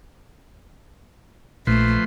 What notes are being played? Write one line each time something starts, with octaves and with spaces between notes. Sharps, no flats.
A#1 F3 A3 B4 C6